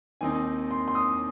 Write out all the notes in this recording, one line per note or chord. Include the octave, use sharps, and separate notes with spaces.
D#2 D#3 C4 D#4 G#5
C6
C6
D#6